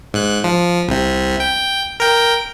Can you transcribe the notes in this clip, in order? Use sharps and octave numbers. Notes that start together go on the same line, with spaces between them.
G#2 F#6
F3
C2 C3
G5
A#4 G5